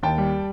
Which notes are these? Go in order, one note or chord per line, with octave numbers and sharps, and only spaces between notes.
D#2 G5 A5
G3